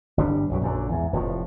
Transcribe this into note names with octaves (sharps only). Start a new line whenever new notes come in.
G1 G3 D4
B1 F#2 B2
A#1 F#2 D3
E2 G#2
F1 A2 C3 F3